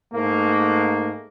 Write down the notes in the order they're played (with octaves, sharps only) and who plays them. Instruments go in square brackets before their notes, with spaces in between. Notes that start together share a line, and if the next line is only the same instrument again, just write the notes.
[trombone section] G#2 A3 A#3